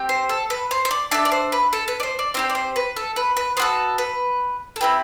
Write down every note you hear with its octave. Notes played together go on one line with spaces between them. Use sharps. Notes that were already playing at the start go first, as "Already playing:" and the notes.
Already playing: C4 G4
C5
A4
B4
C5
C5
D5
D4 A4 E5
D5
C5
B4
A4
B4
D5
C5
D5
C4 E4 G4 C5
D5
C5
B4
A4
B4
B4
B3 F#4 A4 C5
B4
A4
C4 E4 G4 B4